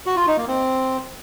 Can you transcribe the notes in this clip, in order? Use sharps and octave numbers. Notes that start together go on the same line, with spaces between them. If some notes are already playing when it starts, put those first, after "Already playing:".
F#4
F4
D#4
A#3
C4